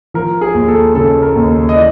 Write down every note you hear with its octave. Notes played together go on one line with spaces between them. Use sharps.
F3 A#4
G#4
D#2
A4
C#3 A4
A#4
D#2
D#5
E3 D5